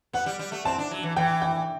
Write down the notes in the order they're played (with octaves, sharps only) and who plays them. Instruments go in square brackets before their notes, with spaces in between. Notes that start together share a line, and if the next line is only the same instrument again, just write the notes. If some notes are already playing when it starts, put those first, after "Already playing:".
[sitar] B3 [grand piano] F#5
[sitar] G3
G3
A3
[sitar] C4 [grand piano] A5
[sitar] D4
F#3
E3
[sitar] E3 [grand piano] G5
[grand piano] G5